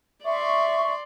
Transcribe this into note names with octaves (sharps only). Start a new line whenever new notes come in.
D5 E5 C6 C#6